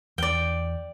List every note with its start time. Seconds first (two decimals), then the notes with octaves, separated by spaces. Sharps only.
0.18 E2 D5 G5